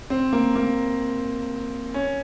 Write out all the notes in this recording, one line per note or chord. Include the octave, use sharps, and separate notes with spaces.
C4
A#3
A#3
C#4